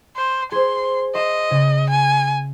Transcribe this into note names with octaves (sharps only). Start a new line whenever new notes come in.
C5
G#4 C5 C6
D#5 E5 C6
C#3
G#5